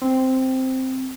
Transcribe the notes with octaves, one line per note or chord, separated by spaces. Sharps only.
C4